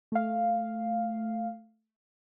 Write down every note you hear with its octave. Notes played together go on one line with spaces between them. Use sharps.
A3 F5